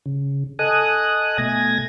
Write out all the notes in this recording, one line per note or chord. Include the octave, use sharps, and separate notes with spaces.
C#3
A4 D#5 G#5 D#6 F#6
B2 A3 G#5 G#6 A#6